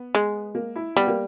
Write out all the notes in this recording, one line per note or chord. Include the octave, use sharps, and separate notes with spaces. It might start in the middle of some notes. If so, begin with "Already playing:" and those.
Already playing: B3
G#3
A#3
E4
G3 B3
A#3